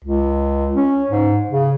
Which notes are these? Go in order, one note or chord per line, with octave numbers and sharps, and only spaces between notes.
C#2
C#4
G#2
C#3